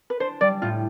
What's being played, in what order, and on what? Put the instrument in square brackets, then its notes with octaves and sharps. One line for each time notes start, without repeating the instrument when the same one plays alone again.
[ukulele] B4
[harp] D4 [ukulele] C5
[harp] G3 [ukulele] D5
[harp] A2 [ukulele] F4